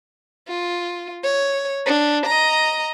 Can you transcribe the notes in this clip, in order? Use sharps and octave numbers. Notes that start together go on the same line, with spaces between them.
F4
C#5
D4
D#5 A#5